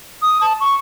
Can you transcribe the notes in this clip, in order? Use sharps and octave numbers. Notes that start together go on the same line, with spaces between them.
D#6
A5
C#6